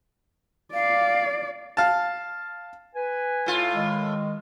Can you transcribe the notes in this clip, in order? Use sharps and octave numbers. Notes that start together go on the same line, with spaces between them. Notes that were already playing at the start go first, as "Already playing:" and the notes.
D5 F5
F5 A5
B4 G#5
A2 F4
D#3 G#3